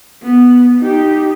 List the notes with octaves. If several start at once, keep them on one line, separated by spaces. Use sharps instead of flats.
B3
D#4 G4